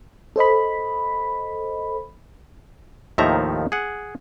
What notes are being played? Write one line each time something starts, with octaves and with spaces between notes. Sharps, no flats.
A4 C5 D#5 B5
D#2 A2 D#3 F3 E5 A#5
G#4 F#5